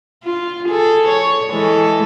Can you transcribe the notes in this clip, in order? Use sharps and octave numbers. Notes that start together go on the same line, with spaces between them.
F4
G#4 A4
C#5
E3 G#3 A4